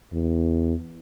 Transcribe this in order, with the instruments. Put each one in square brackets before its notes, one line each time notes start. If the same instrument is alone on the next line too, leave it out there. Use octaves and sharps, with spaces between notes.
[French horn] E2